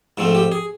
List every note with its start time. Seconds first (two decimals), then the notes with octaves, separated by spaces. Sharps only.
0.17 G#2 F3 A3 C4
0.35 G4
0.52 G#4